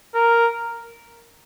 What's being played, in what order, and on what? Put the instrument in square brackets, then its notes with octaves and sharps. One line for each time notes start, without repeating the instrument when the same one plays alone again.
[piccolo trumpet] A#4